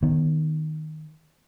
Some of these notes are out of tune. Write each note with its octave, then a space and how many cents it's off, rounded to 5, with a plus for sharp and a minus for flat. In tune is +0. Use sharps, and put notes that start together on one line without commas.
D#3 +0 B3 -15